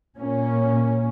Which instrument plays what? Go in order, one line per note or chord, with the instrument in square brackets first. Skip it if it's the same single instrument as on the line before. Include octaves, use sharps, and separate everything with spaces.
[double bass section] A#2 A#3 C#4